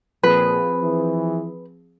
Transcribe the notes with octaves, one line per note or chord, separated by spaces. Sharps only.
A#2 F3 C4 G#4 B4
E3